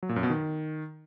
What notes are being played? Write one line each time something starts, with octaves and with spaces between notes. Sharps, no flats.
F#3
A#2
F#2
B2
D#3